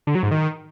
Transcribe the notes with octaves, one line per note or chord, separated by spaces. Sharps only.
D3
F#3
G#2
D#3